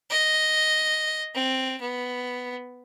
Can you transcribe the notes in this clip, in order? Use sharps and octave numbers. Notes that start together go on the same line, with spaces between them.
D#5
C4
B3